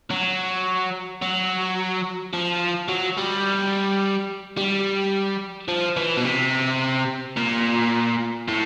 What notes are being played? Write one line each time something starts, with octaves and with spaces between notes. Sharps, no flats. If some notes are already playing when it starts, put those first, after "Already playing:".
F#3
F#3
F3
F#3
G3
G3
F3
E3
B2
C3
A#2
A2